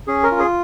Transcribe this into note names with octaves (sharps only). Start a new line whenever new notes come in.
C#4 G#4
A#4
F4
G#4